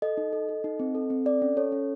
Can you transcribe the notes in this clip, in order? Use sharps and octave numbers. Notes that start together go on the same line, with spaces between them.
A4 D#5
D#4
A4
A4
D#4
C4
A4
C4
A4 D5
C#4
A4 C#5
C#4